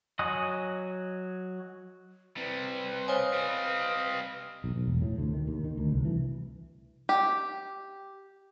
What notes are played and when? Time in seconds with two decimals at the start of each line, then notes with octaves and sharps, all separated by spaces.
0.19 F#3 F#4 D#5 G#5 D#6
2.37 C3 G3 B4
3.08 C5 C#5 D#5 F5 G#5
3.33 G3 C4 F6
4.64 B1
4.76 B1
4.87 E1
5.01 A2
5.18 D2
5.34 D#3
5.47 D#2
5.64 D#3
5.77 D2
5.92 C2
6.05 E3
7.09 G4